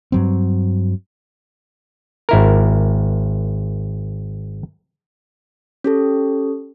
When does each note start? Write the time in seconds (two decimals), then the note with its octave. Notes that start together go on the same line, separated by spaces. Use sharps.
0.12 G2 F#3 C4
2.29 G#1 E4 A#4
5.84 C#4 G4 A4